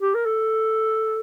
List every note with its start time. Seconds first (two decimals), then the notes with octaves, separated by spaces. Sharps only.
0.01 G4
0.14 A#4
0.26 A4